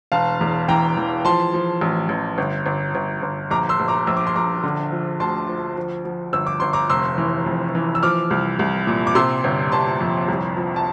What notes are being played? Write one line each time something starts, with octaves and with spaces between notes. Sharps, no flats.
E1 F5 A5
E2
E3 G5 A#5
E3
F3 A5 C6
F3
A1
A1
G1
G1
G1
G1
A#1 A#5 D6
C6 E6
A#1
A#5 D6
A#1 E6
D6
C6
A#1 A#5 D6
D3
F3
D2 A5 C6
F3
F3
F3
G1 E6
D6
G1 C6
A#5 D6
F1 C6 E6
E3
F2
E3
E6
F3 D6 F6
C2
C2
A#2
D6
C3 C6 E6
G1
G1 A5 C6
F2
C2
F3
A5